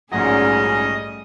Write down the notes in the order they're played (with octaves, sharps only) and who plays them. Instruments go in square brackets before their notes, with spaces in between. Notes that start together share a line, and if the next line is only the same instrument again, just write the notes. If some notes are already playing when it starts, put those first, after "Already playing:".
[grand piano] A#1 G#2 F#3 [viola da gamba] G3 A3 G#4 [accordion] C#4 [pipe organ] D#5